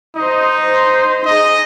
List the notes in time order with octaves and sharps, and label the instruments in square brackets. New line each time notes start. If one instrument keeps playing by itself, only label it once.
[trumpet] D#4 [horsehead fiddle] C5 D#5
[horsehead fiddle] C5
[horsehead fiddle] D#4 G#4 [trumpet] D#5